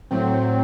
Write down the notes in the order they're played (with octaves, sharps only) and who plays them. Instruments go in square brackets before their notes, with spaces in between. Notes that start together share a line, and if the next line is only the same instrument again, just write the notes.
[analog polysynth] A2 F#3 C4